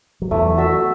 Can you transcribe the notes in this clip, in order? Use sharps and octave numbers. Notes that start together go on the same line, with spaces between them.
F#3
E2 E3 A3
F#4 A4 E5